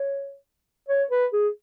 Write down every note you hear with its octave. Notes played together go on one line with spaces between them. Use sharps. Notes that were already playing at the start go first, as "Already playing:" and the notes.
Already playing: C#5
C#5
B4
G#4